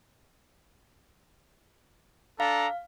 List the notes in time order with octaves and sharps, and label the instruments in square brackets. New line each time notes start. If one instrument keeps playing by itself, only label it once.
[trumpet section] D4 A4 A#5 [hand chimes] F5